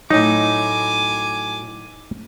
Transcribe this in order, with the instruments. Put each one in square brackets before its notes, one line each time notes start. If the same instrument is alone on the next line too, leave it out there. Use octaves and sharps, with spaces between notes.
[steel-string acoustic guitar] A2 F#3 [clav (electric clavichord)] D#4 [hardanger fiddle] G#5 D6